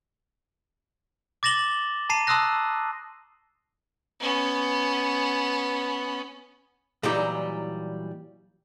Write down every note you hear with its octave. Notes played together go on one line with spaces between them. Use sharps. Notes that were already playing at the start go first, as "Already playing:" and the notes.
D6 A6 A#6 E7 F#7 G7
A5 A#5 C7 D#7
A5 C6 D#6 E6 F#6 A#6
B3 C#4
A#2 E3 F#3 G3 D#4 G4